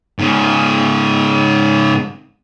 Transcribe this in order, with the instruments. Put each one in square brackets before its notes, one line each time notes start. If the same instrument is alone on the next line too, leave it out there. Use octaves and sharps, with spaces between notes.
[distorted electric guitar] G#2 C#3